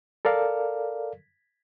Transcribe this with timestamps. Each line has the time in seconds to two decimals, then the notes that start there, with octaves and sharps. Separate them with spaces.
0.25 A4 A#4 D5 F5